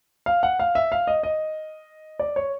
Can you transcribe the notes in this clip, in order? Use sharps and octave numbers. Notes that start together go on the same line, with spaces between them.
F5
F#5
F5
E5
F5
D#5
D#5
D5
C#5